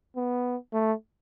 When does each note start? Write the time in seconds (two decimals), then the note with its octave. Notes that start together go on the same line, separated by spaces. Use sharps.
0.16 B3
0.73 A3